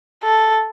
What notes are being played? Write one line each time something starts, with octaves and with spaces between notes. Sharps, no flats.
A4